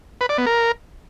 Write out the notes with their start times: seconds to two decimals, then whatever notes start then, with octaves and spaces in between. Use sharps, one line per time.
0.21 B4
0.29 D5
0.38 B3
0.46 A#4